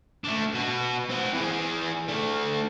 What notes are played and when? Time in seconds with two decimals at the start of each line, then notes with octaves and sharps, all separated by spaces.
0.24 A3 D4
0.54 B2 F#4
1.10 C4 F#5
1.34 E3 G#4
2.08 A3 D4